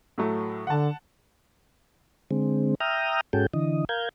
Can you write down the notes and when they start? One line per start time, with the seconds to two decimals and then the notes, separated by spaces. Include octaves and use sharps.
0.18 A2 F#3 A3
0.67 D3 F#5 A5
2.31 D3 G#3 C4
2.80 E5 G5 A#5 D#6 F6
3.33 G#2 C#4 F#4 G#4 A4 G5
3.54 D3 E3 D#5
3.89 A#4 F5 G6 G#6